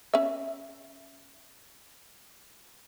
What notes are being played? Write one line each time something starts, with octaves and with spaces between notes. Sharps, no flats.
C#4 E5